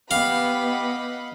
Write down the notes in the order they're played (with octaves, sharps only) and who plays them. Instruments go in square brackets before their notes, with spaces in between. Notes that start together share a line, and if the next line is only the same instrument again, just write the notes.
[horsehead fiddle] B3 [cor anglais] G4 [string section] D#5 F#5 B5 [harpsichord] F5